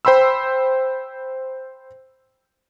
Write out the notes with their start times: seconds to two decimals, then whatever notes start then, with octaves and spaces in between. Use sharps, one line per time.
0.05 C5 G5 B5 C6 E6